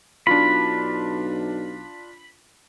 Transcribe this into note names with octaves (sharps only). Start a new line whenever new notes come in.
B1 D4 F4 B5